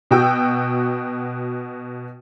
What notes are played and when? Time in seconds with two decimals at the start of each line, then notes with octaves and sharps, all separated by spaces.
0.11 B2 F#4 G5 E6